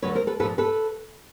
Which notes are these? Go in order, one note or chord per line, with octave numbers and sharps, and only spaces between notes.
D2 D3 F#3 B4 C#5
A#4 C5
A4 B4
A#2 F3 A#3 A4 B4
A4 B4